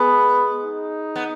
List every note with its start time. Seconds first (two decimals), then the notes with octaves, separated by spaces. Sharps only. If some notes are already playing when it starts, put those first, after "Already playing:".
Already playing: G#3 B3
0.63 D#4
1.16 B3